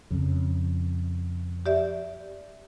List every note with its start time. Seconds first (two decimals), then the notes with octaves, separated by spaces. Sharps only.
0.11 F2 C#3
1.66 G4 D5 E5